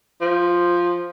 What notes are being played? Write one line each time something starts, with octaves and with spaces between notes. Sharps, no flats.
F3